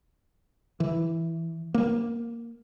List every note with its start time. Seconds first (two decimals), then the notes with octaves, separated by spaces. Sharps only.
0.80 E3
1.74 A#3